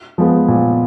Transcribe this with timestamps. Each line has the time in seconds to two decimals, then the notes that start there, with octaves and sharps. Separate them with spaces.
0.18 F3 G#3 B3
0.48 A#2